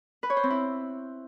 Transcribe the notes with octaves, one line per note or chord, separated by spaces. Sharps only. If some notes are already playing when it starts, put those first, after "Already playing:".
B4
C#5
C5
C4
E4